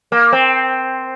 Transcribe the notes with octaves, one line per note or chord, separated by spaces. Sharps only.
A#3
C4